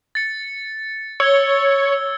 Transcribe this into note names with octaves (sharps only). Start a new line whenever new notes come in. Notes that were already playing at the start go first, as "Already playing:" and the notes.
A6 C#7
C#5 E6 G#6 G7